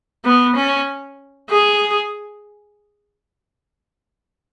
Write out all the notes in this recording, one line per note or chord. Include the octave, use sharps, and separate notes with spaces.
B3
C#4
G#4